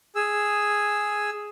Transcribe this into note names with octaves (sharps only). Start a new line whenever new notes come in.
G#4 E6